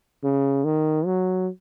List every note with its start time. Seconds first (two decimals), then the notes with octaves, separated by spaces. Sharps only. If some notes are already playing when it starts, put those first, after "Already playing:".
0.24 C#3
0.65 D#3
1.06 F#3